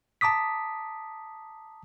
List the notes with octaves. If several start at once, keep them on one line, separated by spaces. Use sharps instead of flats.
A5 A#5 D6 D#6 B6